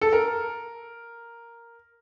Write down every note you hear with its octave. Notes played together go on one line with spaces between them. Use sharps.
A4
A#4